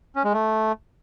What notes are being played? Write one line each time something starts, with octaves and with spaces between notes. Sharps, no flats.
C#4
G#3
A3